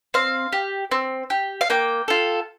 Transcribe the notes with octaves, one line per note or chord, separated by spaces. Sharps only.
C4 F5
G4
C4
G4
F5
A#3 G5
F4 A4